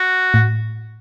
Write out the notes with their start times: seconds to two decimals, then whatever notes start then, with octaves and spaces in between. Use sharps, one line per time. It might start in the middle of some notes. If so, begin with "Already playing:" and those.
Already playing: F#4
0.34 A2